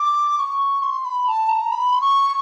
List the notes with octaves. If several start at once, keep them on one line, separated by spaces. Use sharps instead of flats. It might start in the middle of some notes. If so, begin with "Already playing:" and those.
Already playing: D6
C#6
C6
B5
A5
A#5
B5
C6
C#6